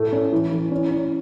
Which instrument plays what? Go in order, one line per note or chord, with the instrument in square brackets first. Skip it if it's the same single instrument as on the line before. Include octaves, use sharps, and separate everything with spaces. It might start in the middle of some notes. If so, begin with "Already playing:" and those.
Already playing: [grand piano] A2 A3
C#4
E3
E3
C#4
C#4